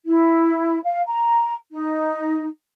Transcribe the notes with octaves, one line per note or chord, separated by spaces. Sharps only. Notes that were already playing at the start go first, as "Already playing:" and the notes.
E4
F5
A#5
D#4